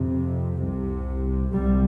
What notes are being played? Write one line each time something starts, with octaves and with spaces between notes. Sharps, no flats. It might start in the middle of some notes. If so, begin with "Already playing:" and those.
Already playing: F2 C3
C2 C3
C2 C3 G3